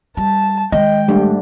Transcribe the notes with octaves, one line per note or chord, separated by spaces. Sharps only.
G3 A5
D#3 G#3 D#5 G5
G#2 G3 A3 D4